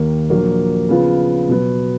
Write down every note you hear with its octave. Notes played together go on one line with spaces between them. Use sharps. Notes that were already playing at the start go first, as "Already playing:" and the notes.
Already playing: D#2 D#3 A#3
A#1 A#2 F#3 A#3
C#3 F3 B3 F4
B2 F#3 B3